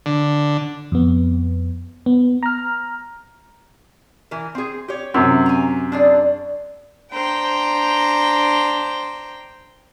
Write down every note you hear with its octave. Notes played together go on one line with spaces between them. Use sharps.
D3
F2 B3
B3
A#5 F6
E3 A#4
C4 G#4
G4 C#5
F#2 C3 C#4
G#5 A#5
D4 G#4 D5
D4 C5 G5 A#5